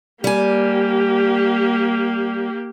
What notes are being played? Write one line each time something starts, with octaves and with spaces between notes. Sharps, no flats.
G3 A#3 G4 G#5